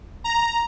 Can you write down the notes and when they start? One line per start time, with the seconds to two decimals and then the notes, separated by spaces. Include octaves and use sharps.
0.24 A#5